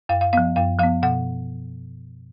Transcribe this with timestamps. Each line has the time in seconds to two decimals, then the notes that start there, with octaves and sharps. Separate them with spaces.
0.09 F#2 F5
0.21 F5
0.33 F3 B3 F5
0.56 F#2 F5
0.79 F3 B3 F5
1.03 B2 F#5